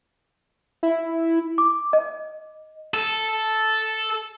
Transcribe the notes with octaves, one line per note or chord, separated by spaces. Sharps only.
E4
D6
D#5
A4